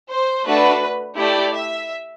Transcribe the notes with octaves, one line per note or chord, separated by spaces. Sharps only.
C5
A3 D4 F#4 B4
A3 E4 G4 D5
E5